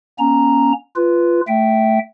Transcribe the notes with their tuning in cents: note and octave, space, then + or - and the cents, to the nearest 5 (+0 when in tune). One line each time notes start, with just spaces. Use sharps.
A#3 +45 C#4 +0 A#5 +0
F4 -15 B4 +0
A3 +0 E5 +0 G5 -15